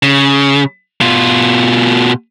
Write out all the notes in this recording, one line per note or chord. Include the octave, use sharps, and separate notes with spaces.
C#3
B2 F4